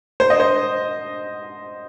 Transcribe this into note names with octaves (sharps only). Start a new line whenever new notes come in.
C5
D#5
C5